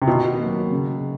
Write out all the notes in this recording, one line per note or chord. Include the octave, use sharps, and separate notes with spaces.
C3
B2 D#3
F#3 A#3
C#3